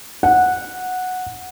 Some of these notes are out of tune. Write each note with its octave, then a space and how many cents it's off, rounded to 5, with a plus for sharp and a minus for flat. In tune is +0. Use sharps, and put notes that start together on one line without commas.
F#5 -10